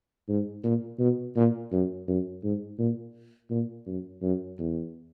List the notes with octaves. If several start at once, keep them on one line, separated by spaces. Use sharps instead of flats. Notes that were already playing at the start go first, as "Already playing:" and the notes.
G#2
A#2
B2
A#2
F#2
F#2
G#2
A#2
A#2
F#2
F#2
E2